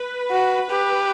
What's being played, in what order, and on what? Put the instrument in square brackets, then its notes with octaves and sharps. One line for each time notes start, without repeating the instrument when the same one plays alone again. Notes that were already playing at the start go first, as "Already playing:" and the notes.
Already playing: [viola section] B4
[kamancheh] F#4
G4